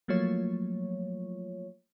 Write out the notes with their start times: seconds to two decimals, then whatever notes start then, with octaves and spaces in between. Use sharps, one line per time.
0.08 F3 F#3 A3 A#3 F4 C#5